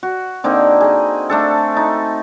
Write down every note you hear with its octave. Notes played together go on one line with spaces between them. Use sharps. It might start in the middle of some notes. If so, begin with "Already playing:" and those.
F#4
D3 A#3 C4 D#4
G#4 D#5
A3 D4 A4
D#4